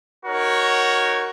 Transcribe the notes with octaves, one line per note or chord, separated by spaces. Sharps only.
D#4 F#4 A#4 C#5